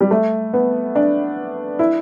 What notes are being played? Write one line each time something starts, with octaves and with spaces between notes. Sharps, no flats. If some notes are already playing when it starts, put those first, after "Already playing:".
G3
A3
B3
D4
E4